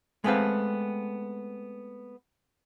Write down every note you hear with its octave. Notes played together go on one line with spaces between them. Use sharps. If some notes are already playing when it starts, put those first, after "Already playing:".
G#3 A3 B3 C4 B4 F5